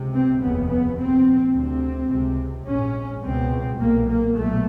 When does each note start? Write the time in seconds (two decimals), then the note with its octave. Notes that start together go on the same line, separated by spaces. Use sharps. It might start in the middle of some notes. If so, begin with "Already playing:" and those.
Already playing: C#2 C3
0.14 C4
0.41 F1 D#2 C#3 B3
0.70 B3
0.97 A#1 A#2 C4
1.54 D2 C3 C4
2.11 C#2 C3
2.67 A#1 G#2 C#4
3.24 C#2 B2 C4
3.80 B1 A#2 A#3
4.08 A#3
4.37 B1 A#2 A3